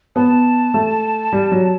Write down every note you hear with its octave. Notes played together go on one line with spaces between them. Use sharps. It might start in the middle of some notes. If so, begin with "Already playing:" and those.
B3 A5
A3
G3
F#3